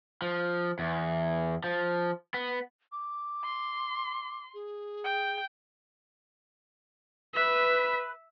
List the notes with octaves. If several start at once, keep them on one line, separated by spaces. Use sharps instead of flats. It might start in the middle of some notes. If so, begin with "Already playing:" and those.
F3
E2
F3
B3
D6
C6
G#4
G5
B4 E5